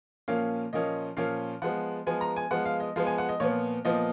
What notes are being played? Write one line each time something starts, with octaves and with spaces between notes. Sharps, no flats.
A#2 F3 A#3 C#4 F5
A#2 F3 A#3 C#4 D#5
A#2 F3 A#3 C#4 F5
F3 G#3 B3 F#5
F3 G#3 B3 G#5
A#5
G#5
F3 G#3 B3 F#5
F5
D#5
F3 G#3 B3 F5
G#5
F#5
D#5
A#2 F3 B3 C#5
A#2 F3 B3 D#5